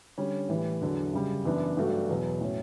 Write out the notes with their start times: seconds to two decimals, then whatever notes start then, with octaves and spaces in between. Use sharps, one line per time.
0.18 D3 G3 C#4
0.49 A2 E3 G3
0.81 E2 D3 F#3
1.13 F#2 C#3 G3
1.45 F#2 E3 B3 D4
1.77 G2 F#3 A3 D4 F#4
2.09 E2 B2 F#3
2.41 A2 F#3 C#4